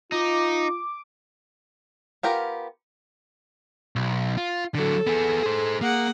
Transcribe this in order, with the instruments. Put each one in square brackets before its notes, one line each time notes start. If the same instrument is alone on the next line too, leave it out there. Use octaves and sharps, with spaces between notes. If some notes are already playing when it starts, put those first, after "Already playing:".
[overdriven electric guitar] D#4 [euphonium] F4 [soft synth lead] D6
[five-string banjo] B3 F4 G4 A#4
[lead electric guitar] B1
F4
[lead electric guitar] D3 F#3 [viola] A4
[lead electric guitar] B3 G#4
G#4 C5
[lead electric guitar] A#3 [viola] G#4 F#5